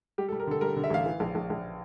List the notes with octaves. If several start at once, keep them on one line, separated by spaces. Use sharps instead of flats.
G3 G4
A4
G3
A#4
D3 A4
G3 A#4
D3
E5
A1 F5
E3
A#1
A#1
A#1